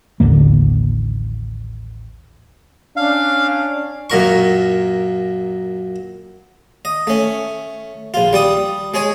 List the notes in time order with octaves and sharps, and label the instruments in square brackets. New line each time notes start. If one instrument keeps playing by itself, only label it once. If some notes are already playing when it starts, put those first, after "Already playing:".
[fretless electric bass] A1 D#2 D3 A#3
[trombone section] C#4 D4 [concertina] F5
[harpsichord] F#2 A#2 A#4 C#6
D#5
A3 C#4
A#1 F4
G3 D5 D#6
G#3 G#4 C#5 G#5